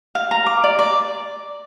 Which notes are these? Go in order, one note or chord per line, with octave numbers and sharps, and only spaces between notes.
F5
A#5
D6
D5
D5